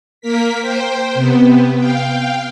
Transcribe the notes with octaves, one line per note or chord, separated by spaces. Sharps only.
A#3 A#4 B6
C5 G5
C3 B3
F5 G5